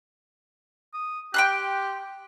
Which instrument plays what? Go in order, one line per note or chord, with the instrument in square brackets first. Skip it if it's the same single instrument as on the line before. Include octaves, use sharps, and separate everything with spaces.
[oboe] D#6
[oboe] G4 [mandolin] G5 C6 F#6